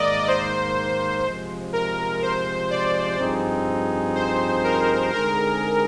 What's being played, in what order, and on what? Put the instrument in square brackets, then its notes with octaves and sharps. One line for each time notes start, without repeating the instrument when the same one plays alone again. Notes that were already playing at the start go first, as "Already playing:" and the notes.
Already playing: [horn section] G#2 D#3 A#3 [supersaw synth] D5 D#5
[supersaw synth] C5
[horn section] C3 F3 G#3
[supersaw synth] A#4
C5
D5
[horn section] G2 F3 C4 D#4 G#4
[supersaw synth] C5
A#4
[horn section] D3 G#3 C4 D#4 G#4 [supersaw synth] A#4